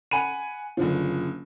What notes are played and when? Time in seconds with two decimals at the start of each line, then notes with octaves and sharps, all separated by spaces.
0.11 F#5 G#5 B5 D#7
0.77 F#1 D3 F3